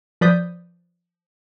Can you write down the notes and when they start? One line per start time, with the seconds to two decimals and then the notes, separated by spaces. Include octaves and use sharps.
0.21 F3 B4 D5 D#6 G6 B6